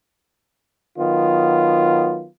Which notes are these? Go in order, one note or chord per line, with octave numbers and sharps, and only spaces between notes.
D#3 F#3 B3 F4